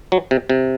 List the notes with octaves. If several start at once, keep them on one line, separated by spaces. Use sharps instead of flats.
F#3
C3
C3